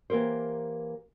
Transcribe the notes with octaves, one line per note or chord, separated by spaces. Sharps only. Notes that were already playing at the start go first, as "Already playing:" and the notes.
E3 A#3 G4 A#4 C5